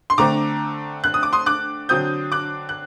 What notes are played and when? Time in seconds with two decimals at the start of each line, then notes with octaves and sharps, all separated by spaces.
0.10 C6
0.18 D3 A3 C4 A#5 D6
1.04 F#6
1.14 D#6
1.23 D6
1.33 C6 D#6
1.46 D6 F#6
1.89 D3 F#3 C4 D#6 G6
2.32 D6 F#6
2.69 F#6